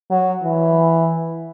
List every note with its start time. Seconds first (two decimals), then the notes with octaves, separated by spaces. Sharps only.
0.10 F#3
0.43 E3